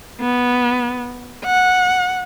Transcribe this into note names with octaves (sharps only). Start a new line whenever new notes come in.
B3
F#5